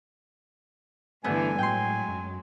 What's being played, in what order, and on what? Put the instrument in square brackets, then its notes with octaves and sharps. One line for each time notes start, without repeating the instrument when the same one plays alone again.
[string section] G2 D3 E3 [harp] A3 B3 [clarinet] G#5
[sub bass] A2 [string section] F#3 G#3 [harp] G5 C6
[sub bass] F#2